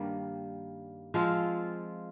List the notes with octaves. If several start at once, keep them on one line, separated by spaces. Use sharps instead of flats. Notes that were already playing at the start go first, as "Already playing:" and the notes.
Already playing: G2 D#3 G3 A#3
F3 G#3 C4 F4